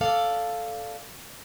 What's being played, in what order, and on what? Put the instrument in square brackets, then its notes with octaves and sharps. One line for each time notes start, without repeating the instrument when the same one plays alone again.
[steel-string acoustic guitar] A4 D5 F5